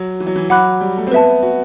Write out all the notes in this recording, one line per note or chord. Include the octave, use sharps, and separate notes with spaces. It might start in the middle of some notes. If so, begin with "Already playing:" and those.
Already playing: F#3
E3
F#3
E3
F#3 F#5 B5 D6 F#6
G3
A3
C4
B3 B4 E5 A5
F#4